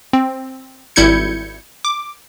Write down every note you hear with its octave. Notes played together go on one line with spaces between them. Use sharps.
C4
G#1 G3 E4 G6 G#6 C#7
D6